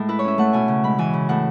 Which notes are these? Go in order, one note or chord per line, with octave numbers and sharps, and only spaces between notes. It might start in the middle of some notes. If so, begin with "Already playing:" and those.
Already playing: A2 G#3
E4 B4
C#5
C#4 E5
A3 F#5
B2 G#5
C#3
G#3 B5
E3 G#5
C#3
A2 F#5